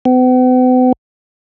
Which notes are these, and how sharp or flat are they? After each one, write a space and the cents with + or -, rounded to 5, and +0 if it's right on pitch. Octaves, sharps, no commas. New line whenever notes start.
B3 +45